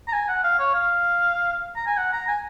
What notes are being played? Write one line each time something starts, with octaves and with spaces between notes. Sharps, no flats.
A#5
G#5
F#5
F5
C#5
F5
A#5
G#5
F#5
A#5
G#5